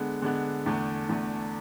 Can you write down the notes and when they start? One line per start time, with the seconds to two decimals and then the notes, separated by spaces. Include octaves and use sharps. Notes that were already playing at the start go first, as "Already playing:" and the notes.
Already playing: D3 G#3 B3
0.22 D3 G#3 B3
0.66 E2 D3 A3
1.09 E2 D3 A3